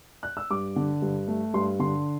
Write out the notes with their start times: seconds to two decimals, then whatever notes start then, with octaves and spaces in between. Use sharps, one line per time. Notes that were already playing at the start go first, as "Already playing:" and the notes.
0.23 F#6
0.37 E6
0.50 G2 D6
0.76 D3
1.02 G2
1.28 A3
1.54 G2 C6
1.79 D3 C6